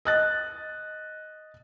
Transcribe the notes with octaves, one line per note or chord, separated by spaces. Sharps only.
D#5 F#6 A6